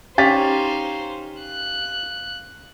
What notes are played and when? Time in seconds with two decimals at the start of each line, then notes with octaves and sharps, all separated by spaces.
0.18 C#4 D#4 G4 C5 F5 A6 B6
1.42 F#6